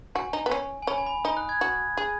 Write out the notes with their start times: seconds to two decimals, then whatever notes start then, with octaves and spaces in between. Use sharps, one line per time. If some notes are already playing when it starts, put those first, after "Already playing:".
0.15 F#4 G#5
0.33 D#4
0.46 B3
0.51 C#4
0.82 G#5
0.87 C#4 B5
0.98 G#5
1.06 B5
1.24 D#4 D#6
1.37 F#6
1.49 G#6
1.61 F#4
1.97 G#4